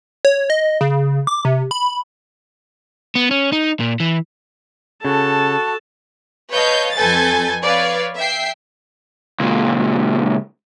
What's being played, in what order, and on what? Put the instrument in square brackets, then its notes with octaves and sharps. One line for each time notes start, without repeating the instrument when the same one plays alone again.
[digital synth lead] C#5
D#5
C#3
D6
C3
B5
[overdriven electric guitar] B3
C#4
D#4
A#2
E3
[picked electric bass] C#3 [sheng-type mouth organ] F#4 [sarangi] A4 [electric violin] A5
[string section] B4 C#5 D#5 F5 A5 G6
F2 A4 B4 G#5 G6 A6
B4 C#5 D5 F5
E5 G5 C7
[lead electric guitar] C#2 A#2